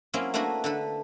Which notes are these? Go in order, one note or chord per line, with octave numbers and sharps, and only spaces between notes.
F#3 A#3 C4 C#4 E4
A3 A#3 D4 E4 F#4 B4
D3 A4 B4